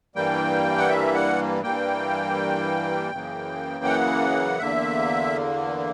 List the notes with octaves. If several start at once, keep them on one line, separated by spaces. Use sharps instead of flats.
G2 E3 G3 A#3 G5
F#5
E5
F#5
G2 E3 G3 A#3 G5
F#2 C#3 E3 A#3
F#5
E2 D3 A#3 E5